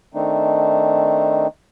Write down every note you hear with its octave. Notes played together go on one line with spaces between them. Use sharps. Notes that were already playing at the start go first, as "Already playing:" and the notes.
D#3 A3 C4 D4 D#4